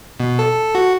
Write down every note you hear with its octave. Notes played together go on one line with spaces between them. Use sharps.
B2
A4
F#4